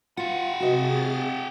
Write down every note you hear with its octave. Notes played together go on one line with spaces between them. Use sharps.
F4 G4 F#5
C3 F#4 G#4 D#5 E5 A6